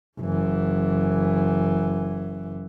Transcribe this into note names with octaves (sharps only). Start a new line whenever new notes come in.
F#1 E3